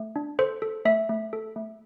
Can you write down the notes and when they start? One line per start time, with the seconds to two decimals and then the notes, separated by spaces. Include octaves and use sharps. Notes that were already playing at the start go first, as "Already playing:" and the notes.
Already playing: A3
0.16 D4
0.39 A4 C5
0.62 A4
0.85 A3 E5
1.09 A3
1.33 A4
1.56 A3